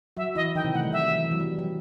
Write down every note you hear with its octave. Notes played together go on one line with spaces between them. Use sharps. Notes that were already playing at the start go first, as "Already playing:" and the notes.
F#3 F#4 E5
E3 E4 D#5
D#3 D#4 G5
C3 C4
A3 F#5
G3
F#3 E5
E3
E3
F#3
G3
F#3